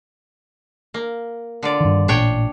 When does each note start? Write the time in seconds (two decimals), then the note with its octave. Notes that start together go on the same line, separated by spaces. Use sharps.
0.94 A#3
1.63 D3 F4 D5
1.80 G2 D#3
2.08 A1 A#2 D4 C#5 G5